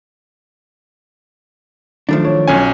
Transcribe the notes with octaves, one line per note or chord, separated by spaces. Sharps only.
D#3 F3 F#3 A3 D4
C#5
B1 C#4 G#5